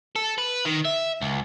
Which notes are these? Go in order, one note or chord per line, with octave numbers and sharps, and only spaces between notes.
A4
B4
D#3
E5
C#2